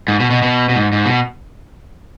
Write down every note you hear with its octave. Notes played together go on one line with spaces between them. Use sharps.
G#2
B2
B2
B2
B2
G#2
G#2
B2